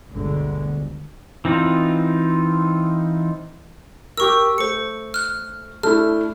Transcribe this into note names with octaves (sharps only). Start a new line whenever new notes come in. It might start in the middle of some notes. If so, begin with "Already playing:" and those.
G1 D2 B2 D3 G#3
E3 C4 D#4 F4
G4 A#4 C#6 E6
A3 C5 C#7
F6 F#6
A3 D4 E4 F6